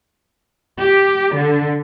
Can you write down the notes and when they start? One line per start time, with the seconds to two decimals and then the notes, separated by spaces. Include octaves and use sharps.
0.79 G4
1.35 D3